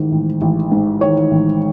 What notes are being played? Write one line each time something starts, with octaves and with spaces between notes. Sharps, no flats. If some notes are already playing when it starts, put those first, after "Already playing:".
Already playing: A1 G#2 D#3
A1
A1
G#2
D#3 C#5
A1